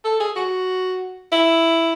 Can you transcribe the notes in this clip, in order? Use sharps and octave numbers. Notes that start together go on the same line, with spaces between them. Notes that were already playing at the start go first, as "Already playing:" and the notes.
A4
G#4
F#4
E4